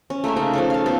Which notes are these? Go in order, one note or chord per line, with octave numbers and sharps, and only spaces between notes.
C#4
A3 A#3 A#4 E5
C#3 D#4
F3 C#4 A4
F5 A5
B3 G4 A4